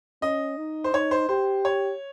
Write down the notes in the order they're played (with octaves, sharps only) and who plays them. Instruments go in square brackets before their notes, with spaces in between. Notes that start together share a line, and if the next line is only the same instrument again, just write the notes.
[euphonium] C#4 [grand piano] D#5
[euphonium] D#4
[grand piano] C5
[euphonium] D#4 [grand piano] C#5
[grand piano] C5
[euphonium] G4 [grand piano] C5
[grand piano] C#5